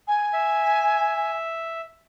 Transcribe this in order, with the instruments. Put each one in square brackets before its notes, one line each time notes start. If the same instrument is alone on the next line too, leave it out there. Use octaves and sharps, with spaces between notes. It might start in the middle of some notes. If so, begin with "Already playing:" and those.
[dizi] G#5
[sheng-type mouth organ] E5